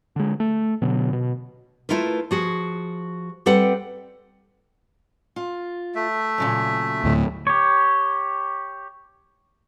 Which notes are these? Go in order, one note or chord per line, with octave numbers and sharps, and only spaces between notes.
D3 G#3
A3
B2 D3 F#3
B2
A3 E4 F4 A#4 B4
F3 F#4 G#4
G3 C4 A4 B4 F#5
F4
A3 E5
A#2 C#3 F#3
D2 A2
G4 C#5